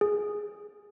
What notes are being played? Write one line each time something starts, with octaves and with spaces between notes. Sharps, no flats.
G#4